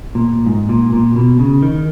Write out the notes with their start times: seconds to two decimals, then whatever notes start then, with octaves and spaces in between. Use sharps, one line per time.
0.15 A#2
0.46 G#2
0.69 A#2
0.93 A#2
1.16 B2
1.39 C#3
1.62 D#3